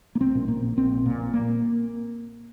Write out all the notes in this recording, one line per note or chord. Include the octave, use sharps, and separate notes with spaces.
A#3
A#1 C4
A#2
C4
A#2 A#3
A#1
A#1 C4
A#2
A#2
A#1
A#3